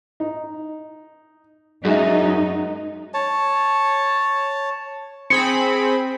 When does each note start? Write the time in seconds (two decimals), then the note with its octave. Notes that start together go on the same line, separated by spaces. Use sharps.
0.20 D#4
1.85 F#2 G#3 D#4 E5
3.14 C#5 A5
5.30 C4 G#4 B5 C#7